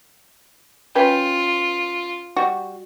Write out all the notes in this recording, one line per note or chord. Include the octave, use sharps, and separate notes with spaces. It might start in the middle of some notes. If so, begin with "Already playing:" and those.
C#4 F4 B4 G5
G3 F#4